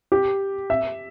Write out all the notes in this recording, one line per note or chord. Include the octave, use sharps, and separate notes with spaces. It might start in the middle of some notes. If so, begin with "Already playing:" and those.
G4
E5